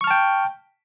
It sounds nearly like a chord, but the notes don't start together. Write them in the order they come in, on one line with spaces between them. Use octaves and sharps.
C#6 F6 A5 G5